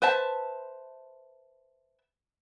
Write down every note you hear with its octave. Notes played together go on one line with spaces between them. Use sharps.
B4 C5 E5 A5